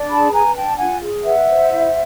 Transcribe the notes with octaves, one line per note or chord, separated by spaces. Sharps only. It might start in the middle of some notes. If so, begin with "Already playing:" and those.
Already playing: D4
G#4 A5 B5
B4 G#5 A#5
D4 G5 A5
F4 F#5 G#5
G#4
B4 E5 F#5
C5
E4